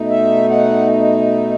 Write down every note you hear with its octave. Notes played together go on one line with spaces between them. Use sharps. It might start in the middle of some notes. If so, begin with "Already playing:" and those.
Already playing: B2 A3 D#4
E5
F#5